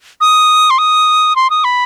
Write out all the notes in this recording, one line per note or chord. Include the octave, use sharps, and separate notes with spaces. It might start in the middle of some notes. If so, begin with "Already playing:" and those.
D#6
C6
D#6
C6
D#6
B5